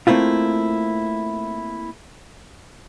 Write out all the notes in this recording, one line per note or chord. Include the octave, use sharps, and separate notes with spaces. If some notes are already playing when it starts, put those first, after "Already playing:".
A3 A#3 C4 E4 F4